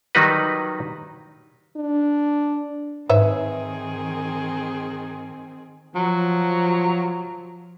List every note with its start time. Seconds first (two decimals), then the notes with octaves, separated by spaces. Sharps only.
0.15 D#3 F#3 G3 D#4 F#4 B4
1.77 D4
3.10 G#2 D#3 C4 G#4 B4 C#5 E5
5.95 F3 F#3